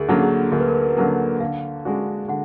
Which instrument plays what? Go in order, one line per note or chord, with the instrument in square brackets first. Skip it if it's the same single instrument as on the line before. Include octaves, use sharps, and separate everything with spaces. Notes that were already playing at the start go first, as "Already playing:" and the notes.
Already playing: [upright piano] D2 [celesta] G#4 A#4
[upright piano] D3 F#3 A#3
[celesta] G#4
[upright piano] D2 [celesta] A#4
[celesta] B4
A#4
B4
A#4
B4
[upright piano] D3 F#3 A#3 [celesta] A#4
[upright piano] D3 [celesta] F5
[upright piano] G#3 D4 F#4
[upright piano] D3 [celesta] F#5